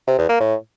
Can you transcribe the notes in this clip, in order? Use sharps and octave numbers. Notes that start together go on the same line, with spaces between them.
C3
E2
A#3
A2